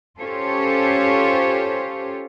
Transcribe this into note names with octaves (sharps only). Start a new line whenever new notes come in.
C#4 F4 G4 A4 C5 C#5